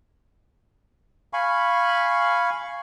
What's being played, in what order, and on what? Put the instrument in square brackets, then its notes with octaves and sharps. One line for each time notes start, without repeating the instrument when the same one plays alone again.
[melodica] F5 G#5 B5 C#6